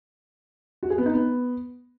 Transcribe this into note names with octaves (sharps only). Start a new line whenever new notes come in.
F#4
G#4
B3
D#4
B3